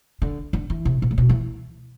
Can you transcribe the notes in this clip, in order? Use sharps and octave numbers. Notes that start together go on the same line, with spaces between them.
D3
D3
E3
C3
B2
A2
B2
E3